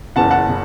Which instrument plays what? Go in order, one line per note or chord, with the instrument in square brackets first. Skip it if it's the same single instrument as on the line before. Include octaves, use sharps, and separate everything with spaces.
[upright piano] F#1 E2 C#3 F#5 A5
F#5 A5
C#3